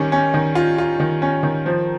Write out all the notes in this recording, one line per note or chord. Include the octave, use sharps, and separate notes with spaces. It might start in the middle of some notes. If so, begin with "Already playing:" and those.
Already playing: D#3 G3 C#4
C#4
D#3
F4
F4
D#3
C#4
D#3
F3